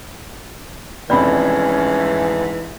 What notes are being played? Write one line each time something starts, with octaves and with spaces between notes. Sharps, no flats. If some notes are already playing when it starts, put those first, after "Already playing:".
F1 F2 G#2 E3 C#4 D5 B5